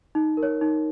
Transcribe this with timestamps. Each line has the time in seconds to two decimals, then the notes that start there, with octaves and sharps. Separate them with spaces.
0.15 D#4
0.37 A#4
0.43 C#5
0.61 D#4